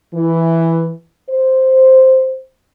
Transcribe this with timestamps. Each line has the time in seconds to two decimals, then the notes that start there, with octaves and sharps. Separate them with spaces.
0.14 E3
1.30 C5